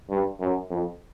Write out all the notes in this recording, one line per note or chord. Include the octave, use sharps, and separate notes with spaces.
G2
F#2
F2